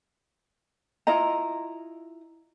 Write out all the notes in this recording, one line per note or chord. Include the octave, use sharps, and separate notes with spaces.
E4 F4 D#5 A#5